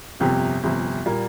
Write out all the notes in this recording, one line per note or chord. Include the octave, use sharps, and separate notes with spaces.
G1 F2 C3 G4
G1 F2 C3
A#2 G3 A#3